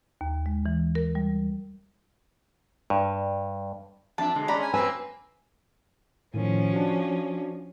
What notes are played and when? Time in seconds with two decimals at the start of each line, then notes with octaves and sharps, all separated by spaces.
0.21 D#2
0.46 G#3
0.66 E3
0.95 A#4
1.15 G3
2.90 G2
4.18 F2 D4 E5 A5
4.35 B2 D3 G#3
4.48 G#3 C#4 D5 A#5 B5
4.61 G#5
4.74 F#3 A#3 C4 B4 G#5 E6
6.34 A2 D#3 F3 C#4
6.73 D4 F#4